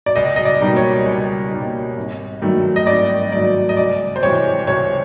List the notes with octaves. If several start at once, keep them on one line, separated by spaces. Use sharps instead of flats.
D5
C#2 D#5
D#5
D5
B2 G3 A#3 D#4
C#5
C#2
B2 G3 A#3 D#4
G#1
G2 D#3 F#3 A3
D#5
G#1 D5
G2 D#3 F#3 A3 D5
D#5
C#2 D5
C5
C3 E3 G#3 C#5
C#2 C#5